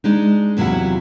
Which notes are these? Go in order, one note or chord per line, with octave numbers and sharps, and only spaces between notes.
G#3 D4 D#4
E2 C3 F#3 E4 F4 F#5